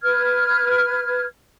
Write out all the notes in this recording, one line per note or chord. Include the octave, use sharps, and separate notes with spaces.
B4 F6 G#6